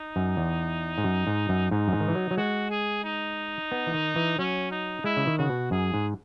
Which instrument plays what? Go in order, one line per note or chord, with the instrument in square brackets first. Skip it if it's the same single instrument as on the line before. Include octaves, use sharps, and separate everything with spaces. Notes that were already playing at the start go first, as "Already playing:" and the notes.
Already playing: [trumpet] D#4
[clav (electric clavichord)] F#2
E2
G#2
F#2
G#2
F#2
[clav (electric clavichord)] G#2 [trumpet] D#4
[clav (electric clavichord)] F#2
G#2
D#3
E3
F#3
F#3
[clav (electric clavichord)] G#3 [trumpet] F#4
[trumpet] G#4
D#4
[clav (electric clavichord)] B3
E3
D#3
E3
[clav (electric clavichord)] F#3 [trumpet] C#4
[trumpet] D#4
[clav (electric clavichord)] G#3 [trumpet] E4
[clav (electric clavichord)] C#3
D#3
[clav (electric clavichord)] C#3 [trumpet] F#4
[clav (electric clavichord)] B2
[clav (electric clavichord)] F#2 [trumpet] G#4
[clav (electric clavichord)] G#2